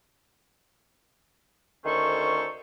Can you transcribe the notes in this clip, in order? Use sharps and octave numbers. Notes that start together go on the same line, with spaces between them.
D2 D#3 C#4 A4 C5 C#6